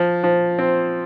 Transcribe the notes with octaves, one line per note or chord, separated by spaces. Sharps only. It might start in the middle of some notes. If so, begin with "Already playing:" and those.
Already playing: F3
F3
C4